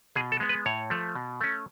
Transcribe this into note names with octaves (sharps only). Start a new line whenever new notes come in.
B2 G#4
A4
G#3 B3
B4
A2 C#5
F3 A3
B2
A3 C#4